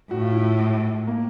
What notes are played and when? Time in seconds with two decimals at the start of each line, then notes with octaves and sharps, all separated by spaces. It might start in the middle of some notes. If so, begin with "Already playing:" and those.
0.11 A2 F#4
0.22 F4
0.32 E4
1.07 A#3